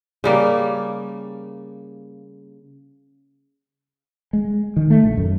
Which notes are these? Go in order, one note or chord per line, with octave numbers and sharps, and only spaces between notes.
C#3 G3 A#3
G#3
D#3
A3
A#1
F#2